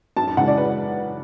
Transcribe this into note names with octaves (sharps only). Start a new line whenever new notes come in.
F#2 A5
A5
C#3 E3 G#3 F#5
D5
B4